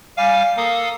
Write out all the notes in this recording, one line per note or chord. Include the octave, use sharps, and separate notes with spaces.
G3 F5 G#5 D6
A#3 A4 F5 D#6